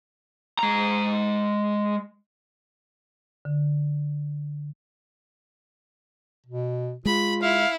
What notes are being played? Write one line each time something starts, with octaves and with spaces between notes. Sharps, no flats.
G#3 A#5
D3
B2
G#3 F4 B5
E4 F5